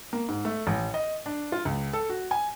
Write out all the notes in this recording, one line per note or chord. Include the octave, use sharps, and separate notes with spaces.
A#3
G#2
A3
A1
D#5
D4
F4
C#2
A4
F#4
G#5